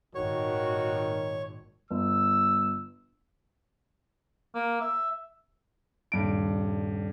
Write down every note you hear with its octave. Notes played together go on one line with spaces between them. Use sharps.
G#1 A#2 D#3 F#4 C#5
G1 E6
A#3
E5
D#1 G2 D7